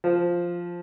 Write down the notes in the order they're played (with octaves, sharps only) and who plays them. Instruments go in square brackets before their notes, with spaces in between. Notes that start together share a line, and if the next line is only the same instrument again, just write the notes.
[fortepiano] F3